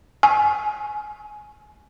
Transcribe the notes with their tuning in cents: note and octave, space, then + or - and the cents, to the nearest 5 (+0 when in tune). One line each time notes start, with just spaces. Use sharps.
G#5 +20